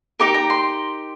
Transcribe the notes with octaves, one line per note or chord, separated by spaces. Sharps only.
D#4 G4 A#4 D6
A#5
C6